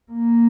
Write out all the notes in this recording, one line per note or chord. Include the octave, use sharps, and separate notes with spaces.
A#3